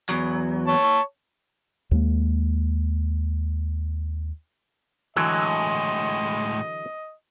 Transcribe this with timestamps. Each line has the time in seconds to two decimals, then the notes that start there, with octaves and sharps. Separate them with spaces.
0.09 E2 F#3
0.68 C#5 A5
1.91 D#2 G#3 A#3
5.16 A2 D3 E3 F#3 G#3 D#5